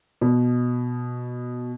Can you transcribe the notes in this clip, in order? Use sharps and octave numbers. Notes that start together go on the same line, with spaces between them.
B2